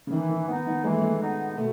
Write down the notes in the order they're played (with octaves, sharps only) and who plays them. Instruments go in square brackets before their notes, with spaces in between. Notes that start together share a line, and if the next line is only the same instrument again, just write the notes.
[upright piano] C#3
[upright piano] D#3 [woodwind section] E3
[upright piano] D#3
[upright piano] D#3 [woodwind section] B3 D#4
[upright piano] D#3
[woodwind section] E3 [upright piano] G#3
[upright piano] A3
G#3
[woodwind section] B3 D#4
[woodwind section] B2 [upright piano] A3